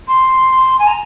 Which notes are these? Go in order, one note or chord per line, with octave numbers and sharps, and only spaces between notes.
C6
G#5
A#5